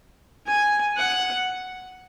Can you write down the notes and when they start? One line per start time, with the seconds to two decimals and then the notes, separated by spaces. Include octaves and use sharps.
0.47 G#5
0.97 F#5